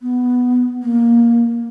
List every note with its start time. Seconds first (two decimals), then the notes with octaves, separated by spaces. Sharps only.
0.02 B3
0.83 A#3